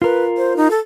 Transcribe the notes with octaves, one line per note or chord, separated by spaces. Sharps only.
F4 A#4 B4
C5
D#4
A4